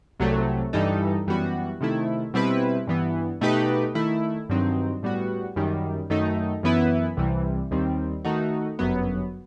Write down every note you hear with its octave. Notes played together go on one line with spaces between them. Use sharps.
C2 C3 F#3 A3
G2 E3 G3 D#4 A4
F#2 E3 G3 B3 F#4
C3 D#3 A3 E4
B2 G3 C4 E4 B4
G2 E3 B3
B2 A3 D#4 G4 B4
D#3 A3 E4
G2 D#3 F#3 C4 D#4
A2 G3 B3 F#4
F#2 D#3 G3
F#2 D#3 A3 D#4
F#2 E3 B3 E4 B4
C2 C3 E3 G3
D#2 D#3 G3 C4
D#3 A3 D#4 F#4
G1 F#2 F#3 B3